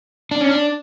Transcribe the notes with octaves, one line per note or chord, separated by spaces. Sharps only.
D4
C#4
D4